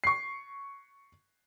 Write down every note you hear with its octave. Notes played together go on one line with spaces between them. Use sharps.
C#6 C7